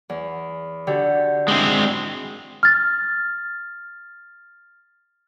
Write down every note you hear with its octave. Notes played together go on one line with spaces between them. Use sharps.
E2
D3 F#4 G4
G#3 C4 D4 E4
F6 A6